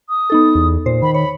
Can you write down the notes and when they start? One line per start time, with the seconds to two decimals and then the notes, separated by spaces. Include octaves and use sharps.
0.09 D#6
0.30 B3 D#4 A4
0.55 E2
0.86 A#2 C5
1.02 D#3 B5
1.14 C#5 B5